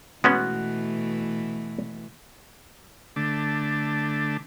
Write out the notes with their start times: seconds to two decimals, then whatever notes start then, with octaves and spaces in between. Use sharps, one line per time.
0.24 B2 E3 G#3 A3 B3 C#4 F#4
3.16 D3 A3 D4